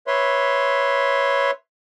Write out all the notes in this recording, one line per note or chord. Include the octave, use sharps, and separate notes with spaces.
B4 C#5 E5 C6